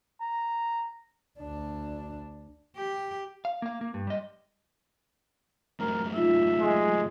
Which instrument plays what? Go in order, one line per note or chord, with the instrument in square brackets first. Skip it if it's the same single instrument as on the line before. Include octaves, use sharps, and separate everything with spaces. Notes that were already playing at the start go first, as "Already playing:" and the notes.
[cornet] A#5
[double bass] D2 D4
[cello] G4
[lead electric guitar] F5
A#3 F5
A#3
G2
G3 D#5
[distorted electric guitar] F#2 A2 [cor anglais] A#4
[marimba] D#4 F4 [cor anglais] E5
[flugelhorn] G#3